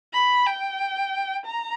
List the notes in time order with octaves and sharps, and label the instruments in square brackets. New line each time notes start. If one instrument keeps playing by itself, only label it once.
[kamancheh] B5
G5
A#5